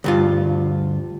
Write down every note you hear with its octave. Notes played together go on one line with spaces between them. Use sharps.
D2 G2 F4